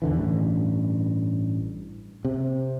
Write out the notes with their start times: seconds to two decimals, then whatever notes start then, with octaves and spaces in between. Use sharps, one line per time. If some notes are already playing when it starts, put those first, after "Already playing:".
0.02 E2 D3 E3
0.16 A1 G2
2.25 C3